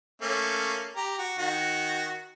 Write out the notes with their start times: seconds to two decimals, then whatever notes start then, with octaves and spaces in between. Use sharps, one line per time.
0.22 A3 A#3 C#4
0.96 G4 A#5
1.19 F#4
1.38 D#3 F#4